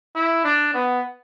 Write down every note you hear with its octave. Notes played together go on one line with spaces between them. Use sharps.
E4
D4
B3